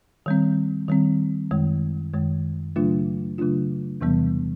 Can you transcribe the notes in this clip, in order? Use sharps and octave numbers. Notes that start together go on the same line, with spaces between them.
D#3 G3 C4
D#3 G3 C4
F#2 D#3 G#3
F#2 D#3 G#3
C#3 F#3 A3 D4 F4
C#3 F#3 A3 D4 F4
E2 C3 E3 G3 B3